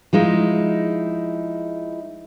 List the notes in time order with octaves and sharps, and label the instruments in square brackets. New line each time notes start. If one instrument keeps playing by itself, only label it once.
[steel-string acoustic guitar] F3 G#3 D#4 E4